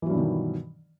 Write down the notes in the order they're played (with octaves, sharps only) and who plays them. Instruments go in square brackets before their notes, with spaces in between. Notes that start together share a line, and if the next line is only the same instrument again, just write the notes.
[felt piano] E3
F#3
G2
B2
D#3